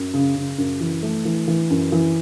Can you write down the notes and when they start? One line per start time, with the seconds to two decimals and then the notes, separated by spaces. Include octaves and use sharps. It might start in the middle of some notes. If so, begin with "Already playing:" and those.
Already playing: F#2
0.14 C#3
0.36 C#3
0.58 F#2
0.81 E3
1.03 A3
1.25 E3
1.48 E3
1.70 F#2
1.92 E3